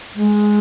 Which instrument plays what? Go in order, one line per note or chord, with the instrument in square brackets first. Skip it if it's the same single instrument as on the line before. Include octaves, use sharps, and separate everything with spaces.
[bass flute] G#3